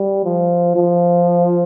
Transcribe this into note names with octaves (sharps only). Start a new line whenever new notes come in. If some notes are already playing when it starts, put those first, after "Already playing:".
Already playing: G3
F3
F3